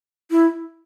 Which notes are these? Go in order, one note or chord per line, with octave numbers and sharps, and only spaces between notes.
E4